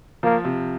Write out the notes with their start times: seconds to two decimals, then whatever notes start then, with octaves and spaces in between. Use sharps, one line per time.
0.23 F3 A#3
0.45 C3